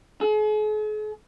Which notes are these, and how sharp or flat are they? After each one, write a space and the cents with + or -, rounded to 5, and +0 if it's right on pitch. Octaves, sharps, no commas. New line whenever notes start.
G#4 +45